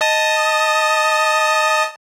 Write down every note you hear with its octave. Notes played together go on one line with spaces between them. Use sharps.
D#5 A5 D#6